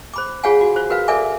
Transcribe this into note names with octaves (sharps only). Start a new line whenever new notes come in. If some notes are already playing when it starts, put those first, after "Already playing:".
C5 B5 D6
F4 G#4 C#5 F5 F#5 G#5
F#4
F4 C5
F#4 A#4 B4 F5
A4 A#4 D5 E5 G#5 D6